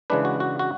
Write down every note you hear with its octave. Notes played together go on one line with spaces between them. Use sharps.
C#3 E3 G#3 D4 B4
F#4
F#4
F#4